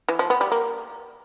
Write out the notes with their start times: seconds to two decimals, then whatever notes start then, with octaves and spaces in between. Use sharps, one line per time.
0.09 E3
0.19 F3
0.30 B3
0.41 G3
0.52 A#3